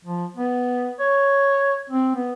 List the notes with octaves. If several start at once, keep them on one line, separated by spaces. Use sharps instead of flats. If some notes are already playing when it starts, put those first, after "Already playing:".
F3
B3
C#5
C4
B3